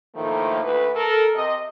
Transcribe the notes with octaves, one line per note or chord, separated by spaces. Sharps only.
A2 D#3 F3 A3 A#3
D2 B4
A4 A#4
C3 D#5